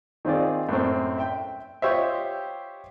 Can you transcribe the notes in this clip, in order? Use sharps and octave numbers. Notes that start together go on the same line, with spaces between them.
D#3 C4 F4 G#4 D5
F#2 A2 C4
E5 G5
F4 G4 C5 C#5 D#5 E5